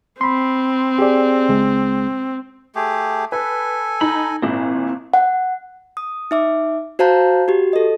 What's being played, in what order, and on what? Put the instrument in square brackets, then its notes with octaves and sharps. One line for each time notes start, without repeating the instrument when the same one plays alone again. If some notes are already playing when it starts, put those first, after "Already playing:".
[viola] C4 [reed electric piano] B5 C6
[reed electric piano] G4 G#4 D5
C#2 G#3
[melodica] A3 G4 G#4
[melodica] A4 G#5 [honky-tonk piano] B4
[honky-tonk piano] D#4 [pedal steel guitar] B5
[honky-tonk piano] G#1 A#2 [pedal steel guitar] C4 E4
[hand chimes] F#5
D#6
D#4 E5 D6
F#4 C5 F5 A5 A#5 G6
F#4 G4
A4 D#5